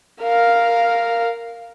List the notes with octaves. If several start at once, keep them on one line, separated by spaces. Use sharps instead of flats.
A#4 F5